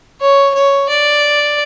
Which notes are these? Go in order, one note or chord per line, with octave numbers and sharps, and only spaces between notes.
C#5
C#5
D5